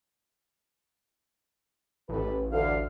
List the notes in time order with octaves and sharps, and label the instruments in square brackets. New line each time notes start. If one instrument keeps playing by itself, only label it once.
[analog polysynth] A1 [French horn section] G4 A4 B4
[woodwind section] D2 F5 [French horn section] D3